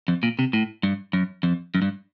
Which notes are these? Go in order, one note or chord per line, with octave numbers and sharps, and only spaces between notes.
F2
A#2
C3
A2
G2
F#2
F2
F#2
G2